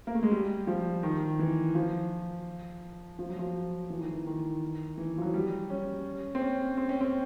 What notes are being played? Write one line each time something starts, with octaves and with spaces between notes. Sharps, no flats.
A#3
A3
G#3
G3
F3
D#3
E3
F3
F3
F#3
F3
E3
D#3
E3
D#3
E3
F3
F#3
G3
C#4
C4
C#4
C4
C#4
C4